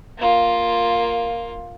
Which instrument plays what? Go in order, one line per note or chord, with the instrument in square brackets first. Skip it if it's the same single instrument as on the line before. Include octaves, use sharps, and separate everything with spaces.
[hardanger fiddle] A#3 F4